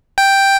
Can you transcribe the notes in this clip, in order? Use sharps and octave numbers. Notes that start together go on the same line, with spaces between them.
G5